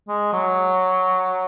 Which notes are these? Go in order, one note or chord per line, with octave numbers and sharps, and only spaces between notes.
G#3
F#3